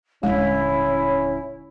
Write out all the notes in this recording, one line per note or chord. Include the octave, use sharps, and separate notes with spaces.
D#1 D3 G#3 C#4 E4